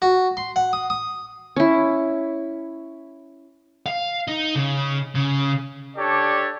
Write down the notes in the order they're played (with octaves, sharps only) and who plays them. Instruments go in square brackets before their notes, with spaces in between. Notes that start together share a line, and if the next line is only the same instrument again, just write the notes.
[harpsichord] F#4
C6
F#5
D#6
D#6
[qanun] C#4 E4
[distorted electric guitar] F5
D#4
C#3
C#3
[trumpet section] D4 G4 A4 C#5 D5